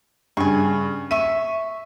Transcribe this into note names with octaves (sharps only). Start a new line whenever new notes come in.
G2 C#3 G#5 C#6
E5 C#6 D#7